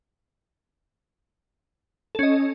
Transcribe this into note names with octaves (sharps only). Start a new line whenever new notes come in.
C#4 A4 D#5